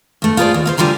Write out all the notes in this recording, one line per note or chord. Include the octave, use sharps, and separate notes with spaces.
G2 A3
F4 G4 G#4 A#4 C5 D5
D#2
F4 A#4 C5
D3 G3 F4 G#5 A#5